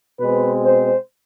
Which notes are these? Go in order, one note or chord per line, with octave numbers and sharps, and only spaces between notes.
B2 G#3 C4 B4
C5